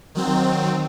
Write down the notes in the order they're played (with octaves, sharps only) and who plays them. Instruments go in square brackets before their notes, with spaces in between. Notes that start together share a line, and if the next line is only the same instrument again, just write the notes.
[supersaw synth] D#3 F#3 C4